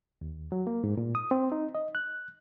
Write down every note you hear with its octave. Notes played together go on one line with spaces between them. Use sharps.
D#2
F#3
A#3
G#2
A#2
D#6
C4
D#4
D#5
F#6